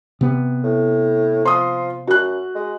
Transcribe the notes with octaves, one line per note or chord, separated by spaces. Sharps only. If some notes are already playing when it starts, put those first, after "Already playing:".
C3 B3
A2
F3 C6 D#6
F#2 F#4 F#6
G#3